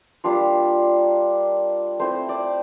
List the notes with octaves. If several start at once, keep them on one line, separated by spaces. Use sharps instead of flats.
G3 A#3 D4 F4
A3 C4 E4 C5
D5